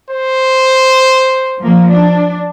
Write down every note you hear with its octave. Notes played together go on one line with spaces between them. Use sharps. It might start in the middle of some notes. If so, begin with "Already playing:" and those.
C5
F3 A#3
D4